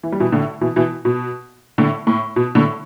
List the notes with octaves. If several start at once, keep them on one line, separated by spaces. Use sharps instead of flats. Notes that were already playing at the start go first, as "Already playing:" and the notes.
E3
G3
B2 E3
A2 D3
B2 E3
B2 E3
B2
A2 D3
A2
B2
A2 D3